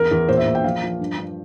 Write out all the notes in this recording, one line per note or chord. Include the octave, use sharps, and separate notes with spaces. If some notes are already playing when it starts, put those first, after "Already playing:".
Already playing: E2 A#4
E2
A#2 C5
E5
A#2
G5
F3 F5
F3
G2
G2